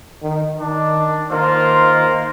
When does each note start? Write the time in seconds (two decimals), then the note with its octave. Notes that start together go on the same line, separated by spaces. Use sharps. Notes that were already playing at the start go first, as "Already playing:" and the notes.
0.22 D#3
0.60 D#3 D4
1.31 D#3 A#3 F4 A#4 C5